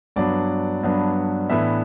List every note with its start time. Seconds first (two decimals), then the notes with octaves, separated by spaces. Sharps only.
0.16 G2 F#3 B3 D4 D5
0.83 G2 F#3 B3 D4
1.49 A2 E3 B3 D4 E5